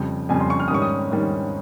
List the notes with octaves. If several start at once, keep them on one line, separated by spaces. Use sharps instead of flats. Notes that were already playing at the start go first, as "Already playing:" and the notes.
Already playing: F2 C#3 G3 G5
F2 C#3 G3 G#5
C6
C#6
F6
D#6
G#2 D#3 G3 C#4 C#6
D#6
G#2 D#3 G3 C#4